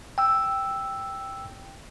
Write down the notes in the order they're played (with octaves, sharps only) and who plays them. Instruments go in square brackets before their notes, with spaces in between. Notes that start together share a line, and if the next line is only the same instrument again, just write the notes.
[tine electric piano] G5 E6